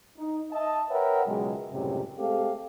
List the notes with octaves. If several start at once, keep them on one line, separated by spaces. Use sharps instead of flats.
D#4
D#5 E5 A5
A#4 B4 C#5 E5 F#5 G5
C#2 B2 F#3 G#3 G#4
C#2 F#2 A2 C3 G3
G#3 A3 C4 G4 A4 F5